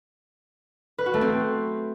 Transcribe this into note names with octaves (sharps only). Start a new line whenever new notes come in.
B4
F#4
A3
C4